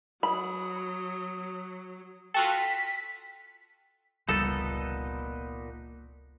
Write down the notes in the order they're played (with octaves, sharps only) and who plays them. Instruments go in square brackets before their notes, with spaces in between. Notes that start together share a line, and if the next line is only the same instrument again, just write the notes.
[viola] F#3 [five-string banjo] B5 [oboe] D#6
[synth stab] F4 F#4 A4 [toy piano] G5 [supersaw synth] B6
[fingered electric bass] F1 C#2 G3 [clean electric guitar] A#2 B3 D#4 [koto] A4